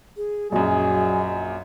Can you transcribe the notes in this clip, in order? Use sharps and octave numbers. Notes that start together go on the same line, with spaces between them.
G#4
A#1 F#2 F#3 G#4 D#5